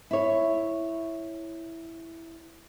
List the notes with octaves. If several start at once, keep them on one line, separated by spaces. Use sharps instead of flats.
E4 C#5